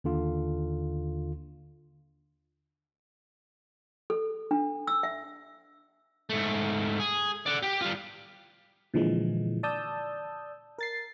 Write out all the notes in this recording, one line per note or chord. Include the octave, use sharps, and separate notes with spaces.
D#2 D3 F4
A4
D4
E6
E5
G#2 A3
G#4
D5 F#5
G4
G3 F4
A#2 D3 E3 F3 G#3
D5 A5 D#6 E6 G6
A#4 A6 C7